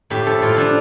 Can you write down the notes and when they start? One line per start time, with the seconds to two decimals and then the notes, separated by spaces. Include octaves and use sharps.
0.10 A2 G4
0.26 F3 A4
0.42 A2 F4
0.57 F3 D4